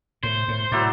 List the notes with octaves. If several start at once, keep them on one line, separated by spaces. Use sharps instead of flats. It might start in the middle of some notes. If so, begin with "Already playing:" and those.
A2 C5
A2
A2 F#3 E4 D5